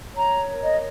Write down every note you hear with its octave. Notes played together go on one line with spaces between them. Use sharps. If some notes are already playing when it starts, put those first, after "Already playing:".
C#5 A#5
A#4
D#5